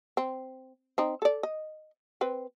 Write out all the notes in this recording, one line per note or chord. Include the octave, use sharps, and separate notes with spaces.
C4
C4 D#4
A4 D5
D#5
C4 B4